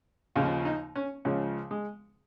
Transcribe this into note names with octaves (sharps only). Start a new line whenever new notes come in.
D#2 C#3 F3 F4
D#4
C#4
C#2 C#3 F3 C#4
G#3